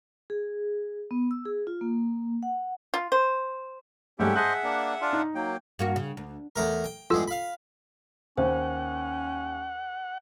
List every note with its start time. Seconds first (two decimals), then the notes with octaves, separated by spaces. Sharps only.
0.30 G#4
1.11 B3
1.31 E6
1.45 G#4
1.67 F4
1.81 A#3
2.43 F#5
2.94 F4
3.12 C5
4.19 G#2 G3 A3 C#4 G4 E5 F#5 G5
4.36 G#4 C5 D#5 E5 F#5 A5 F#6
4.63 A#3 D4
5.01 D4 F4
5.13 D#4
5.35 F#3 A#3 G5
5.79 G2 A#3 F#4
5.96 C#3
6.17 D2
6.56 E2 A3 A#4
6.84 G5
7.10 E2 G2 G#3 F4 A4 E6
7.28 F5 B5
8.38 D#2 C#4 C5 F#5